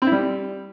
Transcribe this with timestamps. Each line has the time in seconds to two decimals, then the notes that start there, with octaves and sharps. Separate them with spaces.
0.02 C4
0.07 E4
0.12 G3